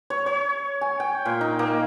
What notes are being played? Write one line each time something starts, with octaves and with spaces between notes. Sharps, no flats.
C#5
C#5
G#5
G5
A#2
D#4
A#3